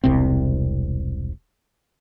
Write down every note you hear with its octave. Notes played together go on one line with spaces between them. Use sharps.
E1 C2 C3 C4